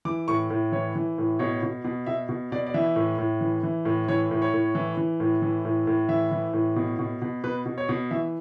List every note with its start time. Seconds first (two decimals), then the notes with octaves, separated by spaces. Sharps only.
0.05 E3 D6
0.28 A2 C#6
0.50 A2
0.72 E3 C#5
0.96 E3
1.18 A2
1.39 B2 C#5
1.63 B2
1.84 B2
2.06 B2 E5
2.29 B2
2.52 B2 D5
2.67 D5
2.74 E3 E5
2.96 A2
3.18 A2
3.41 E3
3.63 E3
3.85 A2
4.08 E3 C#5
4.31 A2
4.42 C#5
4.53 A2
4.75 E3
4.97 E3
5.20 A2
5.42 E3
5.65 A2
5.87 A2
6.09 E3 E5
6.32 E3
6.53 A2
6.76 B2
6.99 B2
7.22 B2
7.44 B2 B4
7.66 B2
7.78 C#5
7.89 B2
8.11 E3 E5